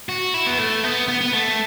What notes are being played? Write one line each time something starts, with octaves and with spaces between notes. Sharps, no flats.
F#4
E4
B3
A3
B3
B3
B3
A3